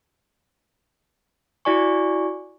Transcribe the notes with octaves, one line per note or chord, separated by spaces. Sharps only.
E4 F#4 D5 G#5 C#6